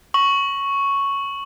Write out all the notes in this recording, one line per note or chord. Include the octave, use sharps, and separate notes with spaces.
C#6 F#7